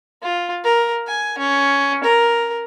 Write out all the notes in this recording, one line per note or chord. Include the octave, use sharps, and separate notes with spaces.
F4
A#4
G#5
C#4
A#4